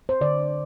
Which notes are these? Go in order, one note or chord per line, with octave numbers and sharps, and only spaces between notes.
C5
D3 D5